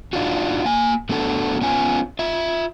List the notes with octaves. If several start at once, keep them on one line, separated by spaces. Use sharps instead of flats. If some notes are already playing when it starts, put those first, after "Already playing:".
D4 D#4 F4 F#4
A#3 G#5
A3 B3 D4 F#4 A4 A5
B3 C#4 F4 G#5
F4 E5